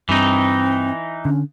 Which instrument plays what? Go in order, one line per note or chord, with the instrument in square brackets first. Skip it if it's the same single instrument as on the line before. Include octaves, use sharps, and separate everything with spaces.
[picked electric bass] G2 [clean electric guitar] E3 D#4 [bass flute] C4
[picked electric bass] D3 [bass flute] C#4